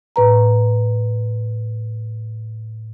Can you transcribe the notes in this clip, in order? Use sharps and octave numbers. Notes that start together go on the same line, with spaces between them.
A2 B4 A#5